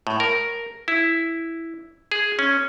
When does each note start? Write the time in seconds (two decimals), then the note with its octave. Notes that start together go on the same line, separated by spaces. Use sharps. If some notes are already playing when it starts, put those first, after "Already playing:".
0.07 A2
0.20 A#4
0.88 E4
2.12 G#4
2.39 C#4